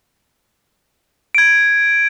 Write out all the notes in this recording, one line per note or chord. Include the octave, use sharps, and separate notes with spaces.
G#6 D7